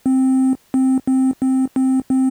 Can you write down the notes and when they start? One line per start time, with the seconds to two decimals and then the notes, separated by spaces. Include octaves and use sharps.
0.06 C4
0.74 C4
1.07 C4
1.42 C4
1.76 C4
2.10 C4